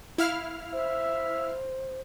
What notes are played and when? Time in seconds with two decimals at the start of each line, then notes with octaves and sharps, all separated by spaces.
0.18 E4 F5 F6
0.73 C5 E5